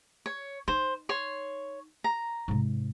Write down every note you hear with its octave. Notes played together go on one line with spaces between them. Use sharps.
C#5
D#4 C5
C#5 C6
A#5
G#2 C3